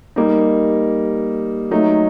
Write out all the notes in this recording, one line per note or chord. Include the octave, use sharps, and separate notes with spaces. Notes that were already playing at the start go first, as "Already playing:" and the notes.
G3 A#3 D#4
F#3 A3 D#4